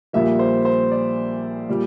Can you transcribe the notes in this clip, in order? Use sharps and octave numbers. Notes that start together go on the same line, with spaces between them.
A#1 A#2 G3 A#3 E5
C5
C5
D5
A#2 G3